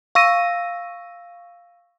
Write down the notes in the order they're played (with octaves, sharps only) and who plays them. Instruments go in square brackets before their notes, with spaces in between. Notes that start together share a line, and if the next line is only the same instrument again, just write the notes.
[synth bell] F5 C#6 E6 A#6 D#7